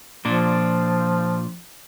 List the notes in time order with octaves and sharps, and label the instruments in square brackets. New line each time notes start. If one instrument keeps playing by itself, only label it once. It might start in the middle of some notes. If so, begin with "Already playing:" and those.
[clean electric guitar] A#2 D4 [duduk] F3